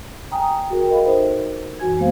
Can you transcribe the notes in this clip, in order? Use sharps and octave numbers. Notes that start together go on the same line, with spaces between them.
G5 G#5 A#5 D#6
F#4 G#4 A#4 G5
A4 A#4 D#5 F5 B5
D#4 C5 E5
F#2 E3 F#4 G#5 G#6
F#3 G#3 A#3 B3 C5 F5